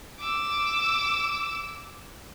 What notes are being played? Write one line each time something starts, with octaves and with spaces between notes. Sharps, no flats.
D6 E6